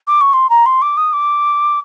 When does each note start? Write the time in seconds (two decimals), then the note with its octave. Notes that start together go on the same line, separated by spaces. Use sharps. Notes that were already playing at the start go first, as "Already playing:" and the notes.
0.07 D6
0.21 C#6
0.33 C6
0.49 A#5
0.66 C6
0.82 D6
0.97 D#6
1.13 D6